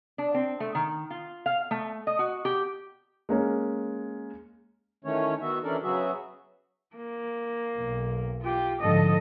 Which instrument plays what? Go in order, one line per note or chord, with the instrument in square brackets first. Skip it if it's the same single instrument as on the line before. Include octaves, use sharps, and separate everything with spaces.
[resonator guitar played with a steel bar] D4
C4
A3
D#3
F4
F5
A3
D#5
F#4
G4
[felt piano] G#3 A#3 C#4
[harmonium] D#3 E3 A3 C#4 C#5
D#3 B3 F#4 E5
E3 C#4 D4 A4 A#4 D5
C#3 F#3 B3 F#4 G#4 E5
[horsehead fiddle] A#3
[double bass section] B1
[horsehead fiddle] F4 G4
[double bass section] G#2 D3 F3 [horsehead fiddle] A4 D#5